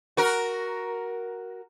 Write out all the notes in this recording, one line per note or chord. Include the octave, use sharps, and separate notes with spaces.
F#4 A#4